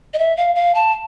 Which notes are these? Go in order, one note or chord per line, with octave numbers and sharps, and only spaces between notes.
D#5
E5
F5
F5
A5